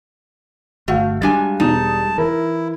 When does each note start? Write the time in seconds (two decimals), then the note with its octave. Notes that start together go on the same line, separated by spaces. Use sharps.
0.88 G1 A3 F#4 F5 F#5
1.22 G3 G#3 D4 G#5
1.60 E1 B2 D#4 A5 D#6
2.18 E3 E4 A#4